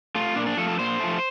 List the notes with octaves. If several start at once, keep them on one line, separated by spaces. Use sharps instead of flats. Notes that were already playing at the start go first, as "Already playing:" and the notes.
A3 F4
A#2 D4
D4
F3 A3 A4
A4
A#2 C5
F3 A3